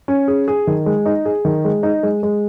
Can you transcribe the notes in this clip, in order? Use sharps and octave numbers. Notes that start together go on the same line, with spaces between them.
C#4
G#4
G#4
D#3
G#3
D#4
G#4
D#3
G#3
D#4
G#3
G#3